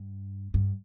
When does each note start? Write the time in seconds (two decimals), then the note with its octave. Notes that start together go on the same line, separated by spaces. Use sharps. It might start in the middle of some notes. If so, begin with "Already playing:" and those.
Already playing: G2
0.54 G2